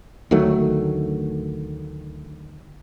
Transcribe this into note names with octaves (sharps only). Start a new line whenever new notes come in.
D2 D#3 F#3 A3